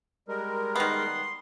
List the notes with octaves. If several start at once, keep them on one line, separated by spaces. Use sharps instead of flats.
G3 G#3 A#4
D#3 B3 C6